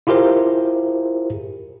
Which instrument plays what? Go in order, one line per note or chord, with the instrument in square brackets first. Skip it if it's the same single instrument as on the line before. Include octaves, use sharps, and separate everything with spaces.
[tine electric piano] E4 F4 G4 G#4 A#4 C5